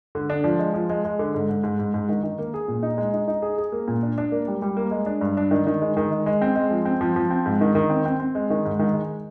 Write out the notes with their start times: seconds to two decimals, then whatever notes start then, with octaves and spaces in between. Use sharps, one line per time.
0.15 D3
0.30 D4
0.44 F3
0.59 G#3
0.74 F3
0.89 G#3
1.05 G#3
1.19 D3
1.35 G#2
1.49 G#2
1.63 G#2
1.79 G#2
1.94 G#2
2.09 D#3
2.24 D#3
2.38 A#3
2.54 G#4
2.68 A#2
2.83 D#4
2.98 G#3
3.13 D#4
3.28 D#4
3.42 G#4
3.58 G#4
3.72 A#3
3.88 A#2
4.03 D4
4.18 D4
4.32 A#3
4.48 G3
4.62 G3
4.77 A#3
4.91 G#3
5.06 D4
5.21 G2
5.37 D4
5.51 D#3
5.67 D#3
5.82 G#3
5.97 D#3
6.12 G#3
6.26 G#3
6.42 C4
6.55 G#3
6.71 F3
6.85 C4
7.01 F3
7.16 F3
7.31 C4
7.46 G#2
7.61 D#3
7.75 D#3
7.90 C4
8.06 C4
8.20 C4
8.35 G#3
8.50 D#3
8.65 G#2
8.79 D#3
8.94 G#3